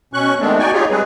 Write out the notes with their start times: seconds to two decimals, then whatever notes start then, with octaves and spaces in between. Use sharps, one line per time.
0.13 B2 C#4 C#6 F#6
0.40 D#3 G#3 A3 B3 C4 D4
0.59 D#4 F#4 D5 G5 G#5 C#6
0.73 D#4 F4 G4 G#4 C#5
0.90 G3 G#3 C4 G#4 B4